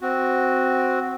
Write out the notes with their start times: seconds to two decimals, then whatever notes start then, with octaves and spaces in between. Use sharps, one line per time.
0.01 C4 F#4